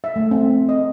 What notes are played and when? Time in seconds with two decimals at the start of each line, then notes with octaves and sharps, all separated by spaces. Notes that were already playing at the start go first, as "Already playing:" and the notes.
0.04 E5
0.16 A3
0.31 C4
0.69 D#5